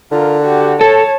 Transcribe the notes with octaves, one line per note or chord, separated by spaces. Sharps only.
D3 F4 A#4
F#4 G4
A4 C#5 A5